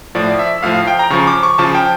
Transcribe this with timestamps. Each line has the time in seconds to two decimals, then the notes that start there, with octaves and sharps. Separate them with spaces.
0.15 A2 F3 D5
0.39 E5
0.63 A2 F3 F5
0.74 F5
0.87 G5
0.99 A#5
1.10 C#3 F3 C#6
1.27 D6
1.43 C#6
1.58 C#3 F3 A5
1.75 G5